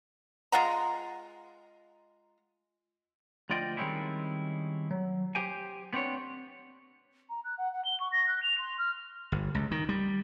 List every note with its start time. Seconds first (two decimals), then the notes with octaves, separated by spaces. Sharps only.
0.52 G#3 F4 F#5 A#5
3.50 D2 F3 F4 D5 D#5 G5
3.77 D#3 G3 G#3 C4 C#4 E4
4.91 F#3
5.35 G4 C5 G5 G#5
5.93 B3 C4 D4 C#5
7.29 A#5
7.44 F#6
7.57 F#5
7.72 F#5
7.84 G7
8.00 C#6
8.11 A#6
8.26 F#6
8.42 F7
8.58 C6
8.78 F6
9.32 G1
9.55 C#2
9.71 D#3
9.89 G3